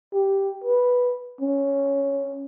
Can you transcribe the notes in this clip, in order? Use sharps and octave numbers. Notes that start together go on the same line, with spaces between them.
G4
B4
C#4